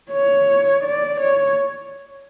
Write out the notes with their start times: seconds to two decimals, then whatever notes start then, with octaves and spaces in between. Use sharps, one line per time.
0.11 C#5
0.84 D5
1.20 C#5